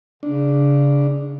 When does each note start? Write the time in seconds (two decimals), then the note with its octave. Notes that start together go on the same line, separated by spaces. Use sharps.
0.23 C#3 D4